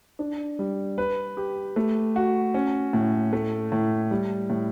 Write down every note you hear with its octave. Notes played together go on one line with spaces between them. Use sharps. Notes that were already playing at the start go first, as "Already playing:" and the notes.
D4
G3
B4
G4
A3
F#4
C#4
A2
A3
A2
G3
A2